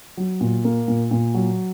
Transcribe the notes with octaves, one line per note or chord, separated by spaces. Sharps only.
F#3
A#2
A#3
A#2
A#2
F#3